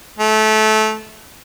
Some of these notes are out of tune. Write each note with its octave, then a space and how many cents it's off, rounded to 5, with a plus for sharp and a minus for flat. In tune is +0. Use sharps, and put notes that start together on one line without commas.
A3 -20